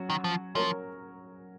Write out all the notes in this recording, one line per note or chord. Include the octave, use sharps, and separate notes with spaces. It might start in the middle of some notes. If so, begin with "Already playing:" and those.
Already playing: F#3 C#4 F#4
D#3
F3
F3 F#3 C#4 F#4 A#4 C#5